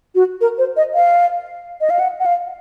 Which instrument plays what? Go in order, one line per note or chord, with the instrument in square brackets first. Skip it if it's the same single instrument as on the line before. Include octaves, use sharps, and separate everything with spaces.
[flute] F#4
A#4
C5
D#5
F5
D#5
F5
F#5
F#5
F5